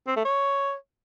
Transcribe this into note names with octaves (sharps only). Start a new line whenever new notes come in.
C4
A3
C#5